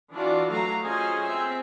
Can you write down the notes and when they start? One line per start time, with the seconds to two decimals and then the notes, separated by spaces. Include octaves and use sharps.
0.13 E3 D4 F4 F#4 D5
0.50 F#3 A3 F#4 F5 A#5
0.84 C#4 F4 G#4 C5 D#5 G#5
1.26 C4 E5